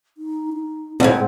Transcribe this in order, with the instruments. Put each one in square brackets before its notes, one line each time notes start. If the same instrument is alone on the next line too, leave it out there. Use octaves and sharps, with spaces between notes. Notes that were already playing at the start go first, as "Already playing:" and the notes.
[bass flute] D#4
D#4
[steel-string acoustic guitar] D2 G#2 [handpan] C4 [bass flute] F#5